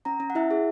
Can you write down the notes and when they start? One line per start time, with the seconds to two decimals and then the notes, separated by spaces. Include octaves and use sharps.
0.05 C#4 A#5
0.20 C#4
0.30 F#5
0.35 E4 E5
0.51 G#4